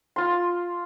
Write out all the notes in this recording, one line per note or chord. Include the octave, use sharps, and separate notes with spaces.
F4 C6